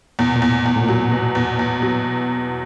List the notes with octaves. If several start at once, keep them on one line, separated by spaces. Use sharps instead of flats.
E2 A#2
B2
A#2
E2
A2
E2
A2
A#2
F#3
B2
E2
E2
F#3
B2